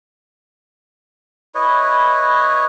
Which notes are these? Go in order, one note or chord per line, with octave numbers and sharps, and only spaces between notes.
E4 B4 C#5 D#5